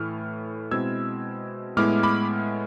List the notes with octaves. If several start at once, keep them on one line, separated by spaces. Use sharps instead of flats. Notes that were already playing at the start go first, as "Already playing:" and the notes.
Already playing: A2 E3 A3 E4 F6
B2 G#3 C4 E4 E6 G#6
A2 G#3 B3 E4 D6 F6
B5 D6